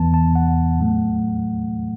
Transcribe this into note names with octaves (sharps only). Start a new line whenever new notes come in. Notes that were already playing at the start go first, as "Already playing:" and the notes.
Already playing: E2 E3 B3 A5
A5
F#5
A2 F#3 A3